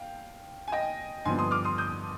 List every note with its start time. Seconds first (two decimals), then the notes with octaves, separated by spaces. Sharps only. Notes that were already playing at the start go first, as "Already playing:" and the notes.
Already playing: F5 G5
0.68 G#5
0.72 D#5 G5
1.25 G2 D3 F3 B3 G#5 C6
1.38 C6 D#6
1.51 D6 F6
1.64 C6 D#6
1.78 D#6 G6